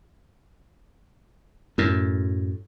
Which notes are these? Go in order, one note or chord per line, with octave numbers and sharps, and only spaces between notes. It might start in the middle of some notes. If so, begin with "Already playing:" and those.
F#2 A2